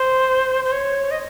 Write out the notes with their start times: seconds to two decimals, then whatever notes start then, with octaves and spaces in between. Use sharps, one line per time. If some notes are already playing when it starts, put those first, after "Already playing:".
Already playing: C5
0.64 C5
0.72 C#5
1.11 D#5